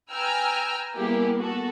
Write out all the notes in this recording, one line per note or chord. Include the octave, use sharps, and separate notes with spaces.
B4 G5 G#5 A#5 E6 F6
G3 A#3 B3 E4 G4 G#4
B3 F#4 A4